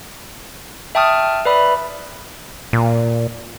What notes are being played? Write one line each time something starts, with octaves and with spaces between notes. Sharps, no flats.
E5 G5 A5 C#6 D#6 F6
B4 D5 E5 B5
A#2